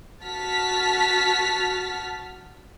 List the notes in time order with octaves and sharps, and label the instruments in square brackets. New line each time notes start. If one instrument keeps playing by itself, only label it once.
[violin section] F#4 A5 F6 A6 B6